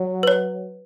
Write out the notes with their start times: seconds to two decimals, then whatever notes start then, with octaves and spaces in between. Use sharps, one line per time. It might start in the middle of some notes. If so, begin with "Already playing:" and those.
Already playing: F#3
0.23 B4
0.28 C#5